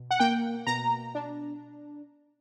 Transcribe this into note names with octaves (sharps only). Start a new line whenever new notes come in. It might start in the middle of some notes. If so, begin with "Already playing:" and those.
Already playing: B2
F#5
A#3 G5
B2 A#5
D4